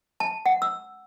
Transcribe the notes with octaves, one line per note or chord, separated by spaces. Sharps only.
A5
F#5
E6